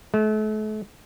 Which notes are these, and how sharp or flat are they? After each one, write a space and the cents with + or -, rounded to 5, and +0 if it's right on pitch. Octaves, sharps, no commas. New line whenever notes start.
A3 -40